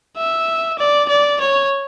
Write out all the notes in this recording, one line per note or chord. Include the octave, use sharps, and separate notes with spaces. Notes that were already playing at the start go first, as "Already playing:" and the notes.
E5
D5
D5
C#5